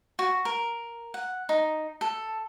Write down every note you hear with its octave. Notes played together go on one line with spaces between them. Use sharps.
F#4
A#4
F#5
D#4
A4